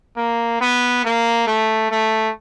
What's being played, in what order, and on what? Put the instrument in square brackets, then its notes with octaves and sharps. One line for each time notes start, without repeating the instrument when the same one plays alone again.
[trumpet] A#3
B3
A#3
A3
A3